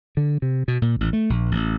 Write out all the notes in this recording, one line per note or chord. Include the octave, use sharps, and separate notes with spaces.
D3
C3
B2
A#2
A1
A3
A#1
A1